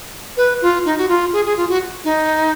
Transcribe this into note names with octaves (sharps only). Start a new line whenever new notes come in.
B4
F4
D#4
F#4
F4
G#4
G#4
F4
F#4
D#4